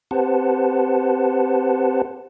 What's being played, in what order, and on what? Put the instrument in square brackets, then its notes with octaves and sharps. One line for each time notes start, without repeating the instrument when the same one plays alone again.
[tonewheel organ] C4 G4 B4 C5 F#5 A5